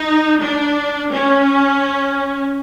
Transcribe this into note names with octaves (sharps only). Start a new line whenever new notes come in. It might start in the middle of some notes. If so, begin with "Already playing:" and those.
Already playing: D#4
D4
C#4